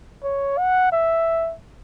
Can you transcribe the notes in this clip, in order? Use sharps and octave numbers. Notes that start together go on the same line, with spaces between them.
C#5
F#5
E5